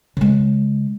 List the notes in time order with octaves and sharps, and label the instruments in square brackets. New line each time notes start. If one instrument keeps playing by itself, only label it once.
[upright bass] C#3 G#3